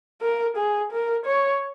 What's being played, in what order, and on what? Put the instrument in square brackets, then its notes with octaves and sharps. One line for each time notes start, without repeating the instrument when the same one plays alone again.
[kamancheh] A#4
G#4
A#4
C#5